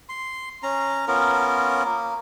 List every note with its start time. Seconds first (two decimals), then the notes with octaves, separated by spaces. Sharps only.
0.09 C6
0.63 C#4 A#5
1.08 B3 C#4 F4 A#4
1.85 A#3